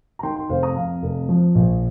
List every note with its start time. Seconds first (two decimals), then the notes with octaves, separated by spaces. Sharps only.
0.19 A#5
0.23 D#3 G5 C6
0.36 G5 C6
0.49 F1 C5 F5
0.63 A#5 D#6
0.76 F2 F5 A#5
1.03 F1
1.29 F3
1.55 A#1